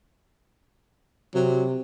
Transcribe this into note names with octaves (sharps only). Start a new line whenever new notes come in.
C3 F#3